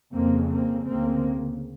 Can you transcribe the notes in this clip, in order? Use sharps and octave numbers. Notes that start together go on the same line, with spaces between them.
F2 C#3 A#3 C4
A#3 C4
D2 C#3 A#3 C4